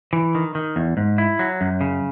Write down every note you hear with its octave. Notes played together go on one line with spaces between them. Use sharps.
E3
D#3
D#3
E2
G#2
E4
F#3
F#2
C#3